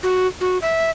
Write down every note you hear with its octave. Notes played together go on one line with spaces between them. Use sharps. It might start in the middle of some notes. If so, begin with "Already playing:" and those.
F#4
F#4
E5